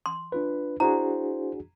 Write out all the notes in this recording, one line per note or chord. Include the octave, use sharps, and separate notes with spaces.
C6
D4 F4 B4
D4 E4 F#4 G#4 C5 A#5